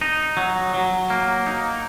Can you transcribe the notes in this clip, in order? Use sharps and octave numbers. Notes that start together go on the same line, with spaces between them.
D#4
F#3
F#3
A#3
D#4